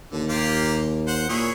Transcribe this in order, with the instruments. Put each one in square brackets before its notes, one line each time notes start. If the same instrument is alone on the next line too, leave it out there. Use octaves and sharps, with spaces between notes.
[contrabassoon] D#2 [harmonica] D3
[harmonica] A#3 F4 G4
C5 F#5
[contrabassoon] A#2 [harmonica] E4 G#4 C#5